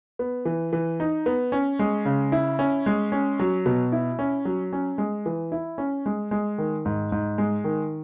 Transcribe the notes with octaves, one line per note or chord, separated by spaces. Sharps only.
B3
E3
E3
D#4
B3
C#4
G#3
C#3
E4
C#4
G#3
C#4
F#3
B2
E4
C#4
F#3
C#4
G#3
E3
E4
C#4
G#3
G#3
D#3
G#2
G#2
G#3
D#3